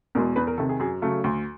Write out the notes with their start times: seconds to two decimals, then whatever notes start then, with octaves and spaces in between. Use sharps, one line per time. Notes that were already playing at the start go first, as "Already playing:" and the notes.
0.15 E2 B2 G#3 A#4
0.36 E2 B4
0.47 A#4
0.58 C3 D#3 A4
0.69 G#4
0.80 F#2 G#4
1.02 C#3 F#3 A3 A4
1.24 D2